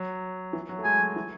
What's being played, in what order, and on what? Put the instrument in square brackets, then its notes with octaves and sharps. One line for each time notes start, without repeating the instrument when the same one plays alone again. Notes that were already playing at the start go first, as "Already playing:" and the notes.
Already playing: [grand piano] F#3
E3
F#3
A3
[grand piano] G#3 [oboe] G#5
[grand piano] F#3
E3